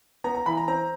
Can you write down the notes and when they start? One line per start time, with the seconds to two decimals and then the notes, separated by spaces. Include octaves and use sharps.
0.24 B3 A#5
0.35 A#5
0.46 E3 B5
0.57 A#5
0.68 C4 A#5